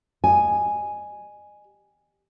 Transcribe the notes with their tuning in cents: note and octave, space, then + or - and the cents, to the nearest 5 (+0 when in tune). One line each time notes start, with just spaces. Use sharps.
G4 +0 D#5 -35 G#5 +0